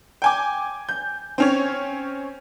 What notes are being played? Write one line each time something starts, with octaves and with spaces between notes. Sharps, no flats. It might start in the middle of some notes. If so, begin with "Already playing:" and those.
G5 G#5 D6
G6
C4 C#4 C#5